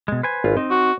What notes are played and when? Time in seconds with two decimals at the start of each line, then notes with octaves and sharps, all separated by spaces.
0.08 B2 G#3
0.23 B4 C5 G#5
0.44 G#1 F4
0.57 C4 D#4 D#5
0.71 F#4